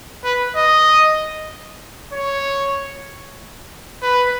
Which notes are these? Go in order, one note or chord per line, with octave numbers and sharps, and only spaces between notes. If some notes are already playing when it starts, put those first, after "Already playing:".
B4
D#5
C#5
B4